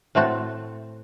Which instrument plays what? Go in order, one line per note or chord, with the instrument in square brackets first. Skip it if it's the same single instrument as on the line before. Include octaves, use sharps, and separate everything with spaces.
[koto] A2 A3 C4 F#4 A4